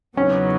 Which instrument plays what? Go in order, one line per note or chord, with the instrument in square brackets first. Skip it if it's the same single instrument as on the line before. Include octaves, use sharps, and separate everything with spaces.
[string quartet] E2 C#3 F#3 B3 D#4 [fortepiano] C#4